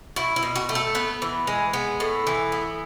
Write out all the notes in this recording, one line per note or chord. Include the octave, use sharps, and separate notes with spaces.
E4 F#4
E4
B2
F#4
A3
A4
B3 B4
E3
G#3
B3
A2
E3
B3